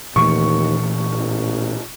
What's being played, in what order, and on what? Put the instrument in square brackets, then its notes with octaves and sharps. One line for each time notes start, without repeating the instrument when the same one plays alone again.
[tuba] D#2 [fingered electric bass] A#2 E3 A3 [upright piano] C#6
[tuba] A1